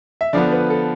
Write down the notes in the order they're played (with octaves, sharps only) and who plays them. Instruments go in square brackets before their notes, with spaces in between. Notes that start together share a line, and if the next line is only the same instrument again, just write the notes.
[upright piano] E5
[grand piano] D3 F3 B3 [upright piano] D5
[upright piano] B4
A4